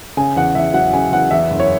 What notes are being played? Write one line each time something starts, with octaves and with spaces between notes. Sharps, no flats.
C#3 G#5
E2 F#5
E2 E5
F#3 F#5
C#3 G#5
E2 F#5
E2 E5
F#1
C#5